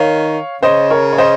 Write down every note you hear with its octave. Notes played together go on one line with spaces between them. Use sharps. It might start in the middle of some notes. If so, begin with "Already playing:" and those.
Already playing: D#3 C#5 F5
C#3 C5 D#5
A#4 C#5
C#5
C5 D#5